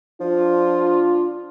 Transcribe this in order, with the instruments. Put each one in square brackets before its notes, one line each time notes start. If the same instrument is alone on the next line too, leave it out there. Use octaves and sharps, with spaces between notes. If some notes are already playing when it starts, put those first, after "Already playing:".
[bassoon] F3 [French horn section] D4 F4